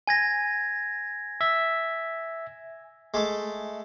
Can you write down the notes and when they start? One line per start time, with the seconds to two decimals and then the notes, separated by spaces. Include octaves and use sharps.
0.08 G#5 G#6 A#6
1.41 E5
3.14 G#3 A3